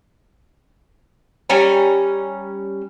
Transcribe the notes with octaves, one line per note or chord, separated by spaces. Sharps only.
G3 C#4 G#5 A#5